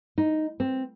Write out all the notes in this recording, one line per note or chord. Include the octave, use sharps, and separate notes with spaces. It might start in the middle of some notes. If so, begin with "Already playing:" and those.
D#4
C4